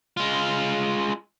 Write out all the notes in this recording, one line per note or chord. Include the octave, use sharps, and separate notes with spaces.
G#3 F4